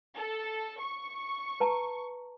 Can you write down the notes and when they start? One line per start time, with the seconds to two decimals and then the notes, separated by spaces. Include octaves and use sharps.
0.16 A4
0.80 C#6
1.60 B4 A5 A#5